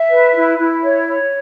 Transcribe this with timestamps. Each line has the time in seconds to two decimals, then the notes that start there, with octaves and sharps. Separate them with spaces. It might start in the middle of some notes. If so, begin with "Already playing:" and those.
Already playing: E5
0.08 B4
0.34 E4
0.58 E4
0.83 C#5
1.07 C#5